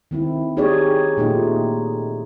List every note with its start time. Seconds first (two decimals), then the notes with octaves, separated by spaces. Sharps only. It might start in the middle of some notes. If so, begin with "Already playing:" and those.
0.11 D#3 C4 E4
0.57 D#4 G4 G#4 C#5 D5
1.17 A#2 A3 D#4 F4 G4